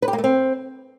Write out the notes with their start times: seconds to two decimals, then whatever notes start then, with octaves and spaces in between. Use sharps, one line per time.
0.02 B4
0.08 G4
0.13 A#3
0.18 A3
0.24 C4